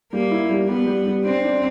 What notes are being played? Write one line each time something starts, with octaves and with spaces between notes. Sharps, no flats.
G3 A#3
E4
G3
G3 B3
G3
G3
C4 D4
D4